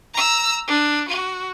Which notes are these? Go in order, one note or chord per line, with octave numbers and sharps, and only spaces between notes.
A#5 E6
D4
F#4